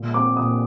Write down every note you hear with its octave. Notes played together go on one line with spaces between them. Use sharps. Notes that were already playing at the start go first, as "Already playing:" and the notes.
Already playing: A#2
C4 D6
A#2 D#6